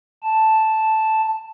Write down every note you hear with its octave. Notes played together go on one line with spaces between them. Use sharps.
A5